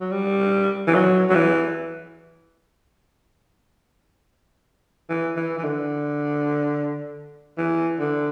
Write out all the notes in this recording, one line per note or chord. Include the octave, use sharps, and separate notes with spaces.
F#3
G3
E3
F#3
F#3
E3
E3
E3
E3
D3
E3
D3